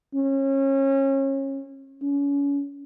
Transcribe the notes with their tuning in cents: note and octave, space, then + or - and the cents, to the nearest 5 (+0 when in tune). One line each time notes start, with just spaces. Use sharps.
C#4 -30
C#4 +30